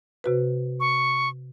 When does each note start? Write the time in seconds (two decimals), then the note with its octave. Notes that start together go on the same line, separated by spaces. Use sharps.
0.24 C3 F#4 B4
0.80 C#6